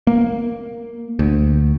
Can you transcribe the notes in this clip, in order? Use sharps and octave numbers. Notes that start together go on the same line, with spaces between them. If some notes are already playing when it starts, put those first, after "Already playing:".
A#3
D2